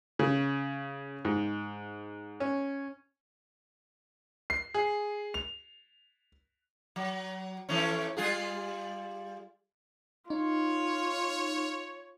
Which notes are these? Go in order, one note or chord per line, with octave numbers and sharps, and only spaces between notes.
C#3
G#2
C#4
C7
G#4
F7
F#3
E3 A3 C#4
G3 F4 G#4
D#4 F4 C#5